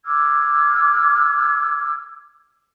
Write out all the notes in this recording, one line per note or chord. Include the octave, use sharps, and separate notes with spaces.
D6 E6 F6 G#6